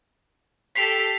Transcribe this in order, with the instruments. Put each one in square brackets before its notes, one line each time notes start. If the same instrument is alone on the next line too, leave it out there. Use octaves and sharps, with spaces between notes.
[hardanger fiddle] G4 A4 [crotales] B6 C7 F7